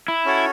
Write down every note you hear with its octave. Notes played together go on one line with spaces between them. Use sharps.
E4
C#4 F#4 A4 C#5